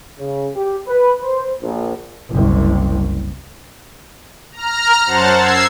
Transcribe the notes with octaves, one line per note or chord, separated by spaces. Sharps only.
C#3
G4
B4
C5
A#1
F#1 C2
A#5 F6
F#2 C5 F#5 A5 A6
E6 G#6 C7